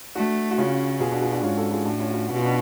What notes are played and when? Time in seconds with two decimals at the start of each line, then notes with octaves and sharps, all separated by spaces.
0.15 A3 D4 F#4
0.51 F#4
0.58 C#3 C#4 F4
1.00 B2 F4 G#4
1.11 D4 F#4
1.22 F4 G#4
1.33 D4 F#4
1.43 G#2 C#4 F4
1.57 F#4 A4
1.71 F4 G#4
1.85 A2 D4 F#4
2.00 C#4 F4
2.09 F#4
2.14 C#4 F4
2.28 B2 F#4
2.36 F4
2.45 D4